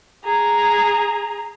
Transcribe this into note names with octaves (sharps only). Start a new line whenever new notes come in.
G#4 A#5